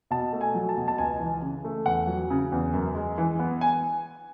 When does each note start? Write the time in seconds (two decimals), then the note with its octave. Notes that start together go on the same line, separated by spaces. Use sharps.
0.11 B2 A5
0.33 A3
0.41 G#5
0.55 F#3
0.69 A5
0.77 B2
0.88 A5
0.98 C#2 G#5
1.20 E3
1.42 C#3
1.64 A3
1.86 E2 F#5
2.07 F#3
2.30 C#3
2.52 E2
2.74 F#2
2.95 G#3
3.18 E3
3.39 B3
3.61 G#5